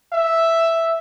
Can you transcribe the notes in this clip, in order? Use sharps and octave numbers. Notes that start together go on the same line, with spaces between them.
E5